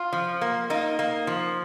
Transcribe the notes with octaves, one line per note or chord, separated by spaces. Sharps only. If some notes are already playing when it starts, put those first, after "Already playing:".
Already playing: F4
F3
A#3
A#3 D#4
A#3
F3